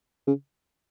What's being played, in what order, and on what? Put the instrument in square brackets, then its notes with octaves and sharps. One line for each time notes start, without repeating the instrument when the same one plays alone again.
[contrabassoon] C#3